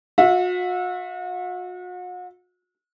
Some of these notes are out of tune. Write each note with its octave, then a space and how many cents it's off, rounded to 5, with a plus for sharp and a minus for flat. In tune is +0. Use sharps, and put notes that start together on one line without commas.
F#4 -40 E5 +0